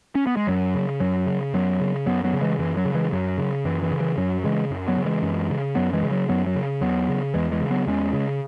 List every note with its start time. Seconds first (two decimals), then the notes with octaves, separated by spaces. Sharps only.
0.15 C#4
0.27 B3
0.37 G#3
0.47 F#2 F#3
0.75 C#3
1.00 F#2 F#3
1.27 C#3
1.53 F#2 F#3 B3
1.80 C#3
2.06 F#2 F#3 B3
2.24 F#3 B3
2.33 C#3
2.41 E3 G#3
2.59 F#2 E3
2.77 F#3
2.85 C#3
2.95 E3 G#3
3.12 F#2 F#3
3.38 C#3
3.65 F#2 E3
3.82 E3
3.91 C#3
4.00 E3
4.17 F#2 F#3
4.44 C#3 E3 G#3
4.70 F#2
4.88 F#3 B3
4.97 C#3
5.05 E3 G#3
5.23 F#2
5.50 C#3
5.75 F#2 F#3 B3
5.93 E3 G#3
6.03 C#3
6.11 F#3
6.29 F#2 F#3 B3
6.46 F#3
6.56 C#3
6.81 E2 F#3 B3
7.09 C#3
7.34 E2 E3 G#3
7.52 E3 G#3
7.61 C#3
7.70 F#3 B3
7.87 E2 G#3 C#4
8.13 C#3